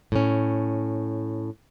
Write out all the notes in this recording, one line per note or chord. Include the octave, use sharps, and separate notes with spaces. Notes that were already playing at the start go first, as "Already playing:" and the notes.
A2 C#4